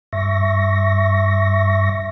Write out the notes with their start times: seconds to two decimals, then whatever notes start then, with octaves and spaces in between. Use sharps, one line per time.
0.13 G2 E5 C#6 A#6